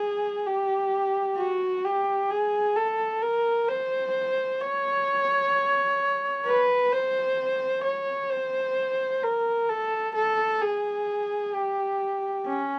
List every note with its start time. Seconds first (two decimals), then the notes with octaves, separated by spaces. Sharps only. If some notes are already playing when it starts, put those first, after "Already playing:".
Already playing: G#4
0.46 G4
1.37 F#4
1.85 G4
2.31 G#4
2.76 A4
3.22 A#4
3.69 C5
4.61 C#5
6.45 B4
6.92 C5
7.84 C#5
8.30 C5
9.23 A#4
9.69 A4
10.15 A4
10.61 G#4
11.54 G4
12.46 C#4